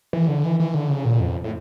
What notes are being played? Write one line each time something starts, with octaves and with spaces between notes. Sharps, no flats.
E3
D3
E3
E3
D3
C#3
A#2
F2
A2